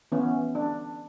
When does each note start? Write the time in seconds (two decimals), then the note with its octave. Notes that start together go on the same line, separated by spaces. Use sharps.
0.12 E3 B3 C#4
0.55 D4